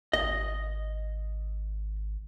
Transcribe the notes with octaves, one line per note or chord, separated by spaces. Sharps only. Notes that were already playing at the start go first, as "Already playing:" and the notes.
G#1 D#5